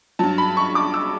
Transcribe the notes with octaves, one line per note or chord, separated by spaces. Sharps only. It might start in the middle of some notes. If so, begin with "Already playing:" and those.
G2 F#3 A5
B5
C#6
D6
E6